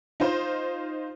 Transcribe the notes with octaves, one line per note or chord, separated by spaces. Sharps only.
D#4 F4 C5